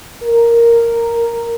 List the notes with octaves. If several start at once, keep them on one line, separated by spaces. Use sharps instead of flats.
A#4